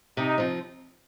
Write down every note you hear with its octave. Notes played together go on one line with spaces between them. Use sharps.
C3 D#4
F3 C4